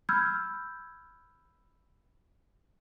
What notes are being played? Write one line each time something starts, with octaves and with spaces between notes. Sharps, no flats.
B5 E6 F6 G6 G#6